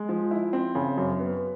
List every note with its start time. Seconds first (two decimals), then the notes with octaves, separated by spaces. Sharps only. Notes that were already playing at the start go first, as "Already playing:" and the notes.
Already playing: G#3
0.09 F3
0.31 E4
0.53 C4
0.75 C#3
0.97 F#2
1.20 B3